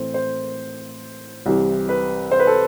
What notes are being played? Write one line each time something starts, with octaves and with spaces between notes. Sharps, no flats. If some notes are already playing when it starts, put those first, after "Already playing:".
Already playing: A2 E3 A3 C4 C5
C5
C2 C3 E3 G3 C4
B4
C5
B4
A4